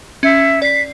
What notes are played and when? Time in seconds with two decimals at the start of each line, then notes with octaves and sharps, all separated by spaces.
0.23 C#4 E5
0.62 D5 B6 C7